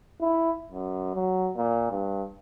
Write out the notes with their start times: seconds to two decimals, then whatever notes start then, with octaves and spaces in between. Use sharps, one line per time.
0.22 E4
0.72 F#2
1.15 F#3
1.56 A#2
1.91 G2